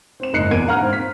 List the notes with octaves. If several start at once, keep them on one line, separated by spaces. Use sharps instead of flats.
C4 E7
F#1 G#2 D#5 F#6 C7 C#7
E2 A#2 A#3 G#6 D7 D#7
G2 F5 F#5 A#5 F6
G#2 C4
B6